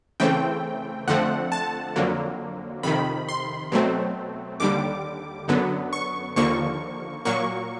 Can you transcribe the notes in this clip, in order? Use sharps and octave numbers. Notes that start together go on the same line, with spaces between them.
C#3 E3 A3 C4 G5
F2 D3 F3 A3 C4 F#5
A5
F2 D3 F#3 A#3
F2 C3 D#3 B5
C6
B2 F#3 A3 C4
D#2 D3 G3 D6
F#2 D3 F#3 B3
C#6
D#2 D3 F3 A#3 C#6
A#2 F#3 A#3 C#6